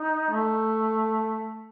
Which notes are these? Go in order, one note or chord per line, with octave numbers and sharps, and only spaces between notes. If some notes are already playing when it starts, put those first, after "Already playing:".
Already playing: D#4
A3